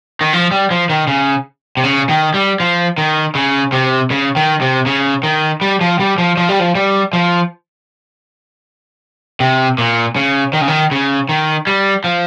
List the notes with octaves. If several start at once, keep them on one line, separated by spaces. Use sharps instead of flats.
D#3
F3
G3
F3
D#3
C#3
C3
C#3
D#3
G3
F3
D#3
C#3
C3
C#3
D#3
C3
C#3
D#3
G3
F3
G3
F3
F3
G3
F3
G3
F3
C3
A#2
C#3
D#3
C#3
D#3
C#3
D#3
G3
F3